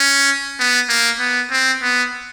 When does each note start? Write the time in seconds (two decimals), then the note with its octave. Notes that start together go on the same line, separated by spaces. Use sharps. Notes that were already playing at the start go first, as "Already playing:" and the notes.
Already playing: C#4
0.59 B3
0.89 A#3
1.20 B3
1.51 C4
1.82 B3